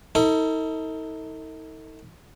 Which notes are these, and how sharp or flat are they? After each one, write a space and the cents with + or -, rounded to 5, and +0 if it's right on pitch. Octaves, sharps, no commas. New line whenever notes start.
D#4 +45 A4 +40